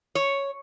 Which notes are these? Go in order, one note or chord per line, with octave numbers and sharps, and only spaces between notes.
C#5